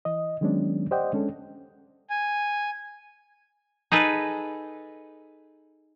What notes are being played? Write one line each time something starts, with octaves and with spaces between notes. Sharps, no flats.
E3 D#5
D#3 F#3 G#3 B3 C#4 D4
G4 C5 D5 D#5 F#5 G5
G#3 C#4 D4 A4
G#5
D#4 G#4 A4 B4